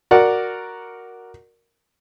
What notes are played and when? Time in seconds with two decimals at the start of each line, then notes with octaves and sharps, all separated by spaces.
0.11 F#4 A#4 D5 F#5